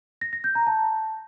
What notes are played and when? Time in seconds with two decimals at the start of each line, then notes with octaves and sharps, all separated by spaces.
0.21 A#6
0.33 A#6
0.44 G6
0.55 A#5
0.67 A5